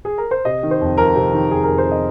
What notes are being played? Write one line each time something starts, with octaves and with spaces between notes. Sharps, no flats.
G#4
A#4
C5
C3 D#5
D#3
C5
F2
F2 A#4
C3
D#3
F2 G#4
F2 A#4
C5
C3
D#5